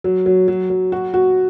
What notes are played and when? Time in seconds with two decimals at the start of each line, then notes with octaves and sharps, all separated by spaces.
0.04 F#3
0.26 F#3
0.48 F#3
0.70 F#3
0.92 F#4
1.14 F#4